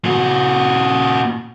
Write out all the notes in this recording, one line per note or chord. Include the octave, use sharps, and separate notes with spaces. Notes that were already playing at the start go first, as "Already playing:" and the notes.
A#2 F#4